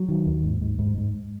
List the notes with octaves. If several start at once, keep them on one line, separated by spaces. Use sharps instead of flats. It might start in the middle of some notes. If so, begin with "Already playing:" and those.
Already playing: F#3
D#3
D#2
G#2
G#2
G#2
G#2